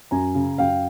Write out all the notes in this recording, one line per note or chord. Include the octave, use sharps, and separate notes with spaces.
F#2 G#5 A#5
C#3
F#2 F5 G5